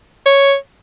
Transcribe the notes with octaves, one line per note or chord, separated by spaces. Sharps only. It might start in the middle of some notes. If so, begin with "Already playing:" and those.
C#5